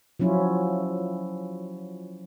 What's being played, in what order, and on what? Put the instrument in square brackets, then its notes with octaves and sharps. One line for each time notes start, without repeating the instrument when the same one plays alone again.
[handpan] F3 F#3 C#4 E4 F4